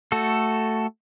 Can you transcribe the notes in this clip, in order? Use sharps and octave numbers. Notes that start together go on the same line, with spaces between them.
A3 F#4 A4